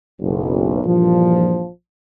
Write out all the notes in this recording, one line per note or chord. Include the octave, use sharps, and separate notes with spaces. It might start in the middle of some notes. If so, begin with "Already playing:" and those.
F#1 B1
A#1 G2 A#2 E3 F3